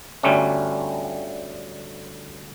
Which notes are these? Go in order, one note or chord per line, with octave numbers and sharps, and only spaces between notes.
G1 D2 G3 A3 C#4